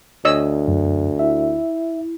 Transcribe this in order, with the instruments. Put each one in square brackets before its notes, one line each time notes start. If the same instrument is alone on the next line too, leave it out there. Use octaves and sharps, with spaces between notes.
[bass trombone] D2 [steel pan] C#5 D#5 E6
[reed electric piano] F#2
[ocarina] E4 [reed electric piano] E5